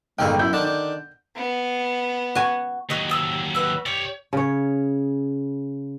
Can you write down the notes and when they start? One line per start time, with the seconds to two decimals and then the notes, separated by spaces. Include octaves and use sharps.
0.19 G1 D#3 G#3 A#3 A4 G5
0.39 F#2 E4 G6
0.53 D3 D#3 D4
0.66 D4
1.36 B3
2.35 F#4 G#5
2.90 D#2 F#3 F#4 D#5
3.09 A5 D#6 E6
3.55 F#4 B4 E5
3.86 G4 C#5 D5
4.33 C#3 C#5